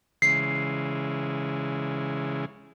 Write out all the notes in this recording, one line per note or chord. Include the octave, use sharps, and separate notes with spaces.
C#3 E3 G#3 C7